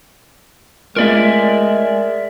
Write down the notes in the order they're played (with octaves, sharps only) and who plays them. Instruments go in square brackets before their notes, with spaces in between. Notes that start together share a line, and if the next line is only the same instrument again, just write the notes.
[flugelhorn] G#3 [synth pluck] A3 F4 [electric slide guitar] A#4 D5 E5